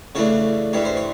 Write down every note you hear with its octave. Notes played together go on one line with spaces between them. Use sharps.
C#3 E3 A3 D4 C#5
G2 E3 G3 C#5
C5
C#5